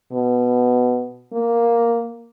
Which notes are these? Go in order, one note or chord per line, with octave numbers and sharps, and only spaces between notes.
B2
A#3